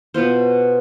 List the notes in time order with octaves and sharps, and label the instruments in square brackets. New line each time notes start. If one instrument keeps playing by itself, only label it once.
[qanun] B2 B3 F4 C5